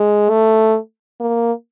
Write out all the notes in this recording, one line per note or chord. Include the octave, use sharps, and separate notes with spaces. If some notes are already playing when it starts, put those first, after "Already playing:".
Already playing: G#3
A3
A#3